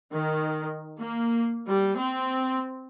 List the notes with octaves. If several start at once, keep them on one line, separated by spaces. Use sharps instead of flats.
D#3
A#3
G3
C4